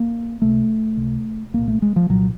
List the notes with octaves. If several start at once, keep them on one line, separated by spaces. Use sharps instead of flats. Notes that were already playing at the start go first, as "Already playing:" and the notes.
Already playing: A#3
C#2 C3 A3
C#2 C3
C2 A#2 A#3
A3
G#3
F3
C2 A#2 F#3